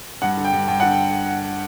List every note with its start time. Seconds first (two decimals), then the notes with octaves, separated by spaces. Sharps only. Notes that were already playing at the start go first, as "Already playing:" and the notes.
0.22 G2 F#5
0.37 D3
0.45 G5
0.53 G2
0.68 G2 G5
0.80 F#5
0.83 D3
0.92 G5